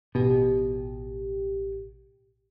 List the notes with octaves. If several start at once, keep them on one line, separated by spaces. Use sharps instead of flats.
A1 B2 G4